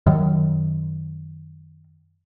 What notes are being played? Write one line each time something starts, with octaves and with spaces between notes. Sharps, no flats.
F#2 D#3